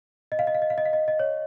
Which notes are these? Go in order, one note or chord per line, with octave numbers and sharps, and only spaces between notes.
D#5
F5
D#5
F5
D#5
F5
D#5
F5
D#5
D#5
C#5